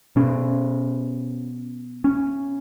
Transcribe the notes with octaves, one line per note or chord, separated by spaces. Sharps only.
B2 C#4
C#4